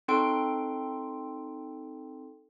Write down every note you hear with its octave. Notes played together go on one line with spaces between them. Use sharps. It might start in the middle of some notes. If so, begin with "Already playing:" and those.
C4 D#4 A4 G5 C6 D7